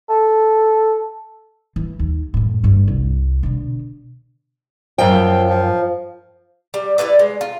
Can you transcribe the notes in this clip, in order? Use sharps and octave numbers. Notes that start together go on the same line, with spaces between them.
A4
E3
D#2
F#2 A2
G1 G2
C2
B2 D3
F#2 F3 G5
F3
G3
G3 E4 B4 D5
G#3
F4